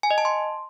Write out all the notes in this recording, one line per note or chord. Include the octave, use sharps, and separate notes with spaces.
G#5
D#5
A5
C6